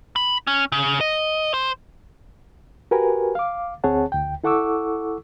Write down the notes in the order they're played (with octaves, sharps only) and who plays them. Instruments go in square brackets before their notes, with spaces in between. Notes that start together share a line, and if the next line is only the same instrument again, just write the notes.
[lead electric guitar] B5
C#4
C#3
D#5
C5
[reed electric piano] F#4 G4 A#4 B4 G#5
F5 D6
D2 C4 G#4 C#5 F#5 A5
D2 G5
E4 A4 F#5 C#6 D6 E6